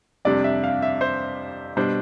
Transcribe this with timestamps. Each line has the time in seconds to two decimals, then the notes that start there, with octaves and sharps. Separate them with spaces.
0.25 F2 C3 G3 D4 D5
0.44 E5
0.64 F5
0.82 E5
1.01 C5
1.77 B2 G3 D4 C5